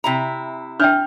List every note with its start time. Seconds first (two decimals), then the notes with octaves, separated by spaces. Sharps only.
0.04 C3 E4 A#5
0.80 D4 E5 G5 F6 G6